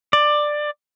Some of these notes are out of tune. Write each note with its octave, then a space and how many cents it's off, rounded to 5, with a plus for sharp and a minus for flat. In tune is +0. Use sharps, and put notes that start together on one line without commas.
D5 +15